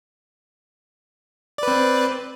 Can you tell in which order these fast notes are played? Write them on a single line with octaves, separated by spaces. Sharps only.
D5 B4 C4